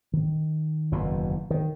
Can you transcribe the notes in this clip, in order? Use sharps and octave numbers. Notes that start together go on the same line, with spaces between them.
D#3
F#1 E2 B2
D#3